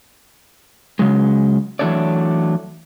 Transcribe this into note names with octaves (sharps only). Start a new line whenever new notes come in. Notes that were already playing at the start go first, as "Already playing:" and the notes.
C#3 F#3 G#3
E3 F#3 A3 D4 C#5 D5